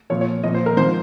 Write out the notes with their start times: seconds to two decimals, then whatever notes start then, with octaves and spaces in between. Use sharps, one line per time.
0.10 A#2 F3 C#5
0.21 C#5
0.44 A#2 F3 D#5
0.54 C5
0.66 A#4
0.77 G#2 F3 C5